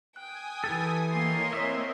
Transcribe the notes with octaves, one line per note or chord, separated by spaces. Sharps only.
G5 G#5 D#6 F#6
E3 G4 A4
A#3 A#4 C#5 D#5 C6
C4 C#5 E5 D#6 B6